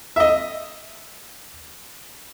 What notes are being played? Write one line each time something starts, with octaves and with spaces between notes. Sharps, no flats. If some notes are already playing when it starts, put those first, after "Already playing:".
D#5 E5